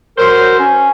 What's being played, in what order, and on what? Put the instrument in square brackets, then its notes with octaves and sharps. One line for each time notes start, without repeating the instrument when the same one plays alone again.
[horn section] F#3 C5 [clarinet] A#4
[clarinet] C#4